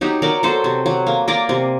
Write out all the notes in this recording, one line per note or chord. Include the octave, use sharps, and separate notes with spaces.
F#3 D#4 G4
F#3 A#4 D5
F#3 A4 C5
C3
F#3
A#3
A#3 A#4 D5
C3